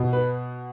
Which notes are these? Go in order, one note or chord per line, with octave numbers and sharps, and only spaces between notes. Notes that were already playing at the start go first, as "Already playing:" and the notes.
Already playing: B2
B4